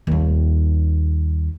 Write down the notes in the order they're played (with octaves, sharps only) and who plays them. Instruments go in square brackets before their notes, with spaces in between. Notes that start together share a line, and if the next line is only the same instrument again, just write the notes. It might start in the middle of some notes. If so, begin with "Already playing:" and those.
[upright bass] D#2 G3